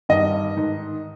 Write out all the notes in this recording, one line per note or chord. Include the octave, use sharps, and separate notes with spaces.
G2 D#3 D#5
G#2 D#3